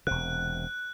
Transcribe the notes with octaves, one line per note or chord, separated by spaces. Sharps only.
E1 C3 F#6